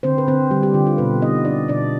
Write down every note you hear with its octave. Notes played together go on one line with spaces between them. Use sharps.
D3 C4 C5
B4
D3 C4 C5
D3 G3 G4
G3 G4
D3 F4
F4
B2 B3 B4
B3 D#4 D#5
D4 D5
B2 D4 D5